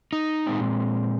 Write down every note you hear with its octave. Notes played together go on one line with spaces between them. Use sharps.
D#4
A#2 G#3 C4